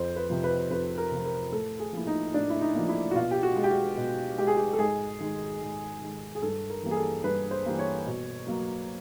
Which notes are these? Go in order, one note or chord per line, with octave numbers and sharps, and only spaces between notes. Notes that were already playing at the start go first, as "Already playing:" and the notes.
Already playing: F2 C5
B4
C3 F3
B4
F2 B4
A#4
C3 F3
A#4
A2 A4
G#4
F3 A#3 E4
D#4
A2 D4
E4
D#4
F3 A#3
E4
F#4
B2 F4
G4
F#4
G#3
G4
F#4
B2
G#3 G4
G#4
G4
A4
G#2 G#4
D#3 G#3
G#2
D#3 G#3
G#4
G2 A4
A#4
E3 G3 A#3
G#4
A4
G2 B4
C5
E3 G3 A#3
C#5
B2
F#3 A#3